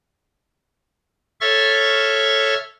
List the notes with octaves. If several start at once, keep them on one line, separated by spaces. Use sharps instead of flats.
A4 C#5 E5 C#6 F6 A6